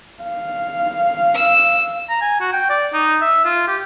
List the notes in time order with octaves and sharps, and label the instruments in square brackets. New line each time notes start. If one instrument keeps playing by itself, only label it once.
[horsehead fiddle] F5
[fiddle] E6
[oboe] A#5
G#5
F#4
G5
D5
D#4
E5
F4
G4